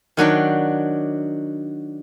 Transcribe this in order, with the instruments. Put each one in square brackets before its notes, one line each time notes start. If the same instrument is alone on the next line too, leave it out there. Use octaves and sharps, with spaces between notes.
[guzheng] D#3 F#3 D4 G5